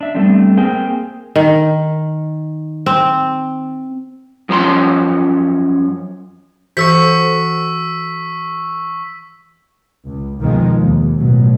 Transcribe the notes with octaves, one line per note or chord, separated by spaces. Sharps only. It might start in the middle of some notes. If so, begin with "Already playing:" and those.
D4 E5
G3 A3 B3 C4 D4
A#3 C4 G#4 G5 G#5
D#3
C4
F#2 F3 C#4 A#5 C6
E3 F#4 A4 C5 C#6 E6 B6
C#2
B1 F2 B2 D#3 F3 G#3
D#2
A1 B2 F#3